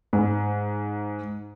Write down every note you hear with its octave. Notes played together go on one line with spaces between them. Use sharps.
G#2